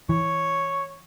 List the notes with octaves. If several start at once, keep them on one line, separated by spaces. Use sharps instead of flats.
E3 C#5